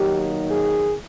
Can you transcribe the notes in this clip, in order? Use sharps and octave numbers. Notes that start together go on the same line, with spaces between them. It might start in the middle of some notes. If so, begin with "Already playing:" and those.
Already playing: D#3 F#3 A#3 D#4 G4
G#4